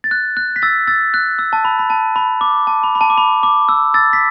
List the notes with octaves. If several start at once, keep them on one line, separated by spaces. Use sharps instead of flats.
A6
F#6
F#6
B6
E6 A6
E6 A6
F#6
E6
A5
B5
B5
A5
B5
D6
A5
B5
B5
A5
D6
B5
D6
E6
E6 A6
B6